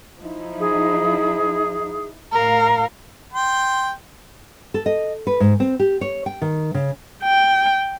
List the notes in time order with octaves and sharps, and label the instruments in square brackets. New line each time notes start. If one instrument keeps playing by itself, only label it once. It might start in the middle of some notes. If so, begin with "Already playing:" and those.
[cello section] F3 D#4 E4
[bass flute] G#4
[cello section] A2 F5 [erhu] A#4
[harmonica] G5 C6
[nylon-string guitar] A4
D#5
B4
G#2
C4
G4
C#5
G5
D#3
C#3
[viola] G5